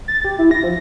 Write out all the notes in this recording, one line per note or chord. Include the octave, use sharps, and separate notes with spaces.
A6
G4
E4
A#6
F3